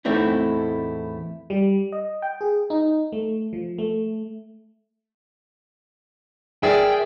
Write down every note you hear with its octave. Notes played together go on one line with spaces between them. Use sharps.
E2 A2 A3 C4 D#4 E4
G3
D#5
G5
G#4
D#4
A3
F3
A3
G#4 A#4 D5 E5 G5